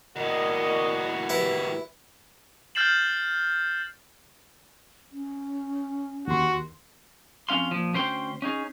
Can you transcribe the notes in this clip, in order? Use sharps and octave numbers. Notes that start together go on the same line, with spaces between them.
D#2 A2 F#4 A#4 D5 D#5
B2 E3 E4 G4 B4
F6 G6 A6 C7 E7 F#7
C#4
D#2 F#4 C6
F2 A#3 C#4 F5 C6
A#2 F3
D2 C#4 C5 G5 C6
C#4 D#4 G#4